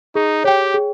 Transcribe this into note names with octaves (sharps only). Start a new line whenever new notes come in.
D#4 G#4
G4 C#5 G5
G#4